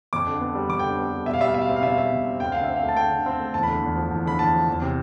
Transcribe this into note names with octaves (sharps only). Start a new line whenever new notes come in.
F2 D6
D3
B3
G3
F2 D6
G5
D3
B3
G3
B2 E5
F5
G3 E5
F5
B2 E5
F5
C4 E5
F5
B2 E5
F5
G3 E5
B2
C4
D2 G5
D3 F5
E5
C4
F5
A3
A5
D2 G5
D3
C4
A3
E2 A5
B5
D3
E2
F3
E2
D3 B5
E2 A5
F3
E2
C3